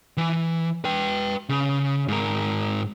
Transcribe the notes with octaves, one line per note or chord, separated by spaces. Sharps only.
E3
B4 G5
C#3
G#2 A#4